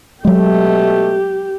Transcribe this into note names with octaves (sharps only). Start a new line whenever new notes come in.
B2 F#3 G#3 A3 G4